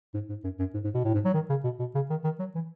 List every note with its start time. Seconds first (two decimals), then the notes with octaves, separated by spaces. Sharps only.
0.14 G#2
0.29 G#2
0.44 F#2
0.59 F#2
0.74 G#2
0.84 G#2
0.95 B2
1.05 A2
1.14 G#2
1.25 F#3
1.34 D#3
1.49 C#3
1.64 B2
1.79 B2
1.95 C#3
2.10 D#3
2.24 D#3
2.39 F#3
2.55 E3